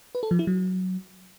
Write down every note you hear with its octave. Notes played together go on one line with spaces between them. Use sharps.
B4
A4
F3
E4
F#3